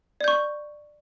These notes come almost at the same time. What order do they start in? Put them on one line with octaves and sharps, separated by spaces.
D5 G6 C#6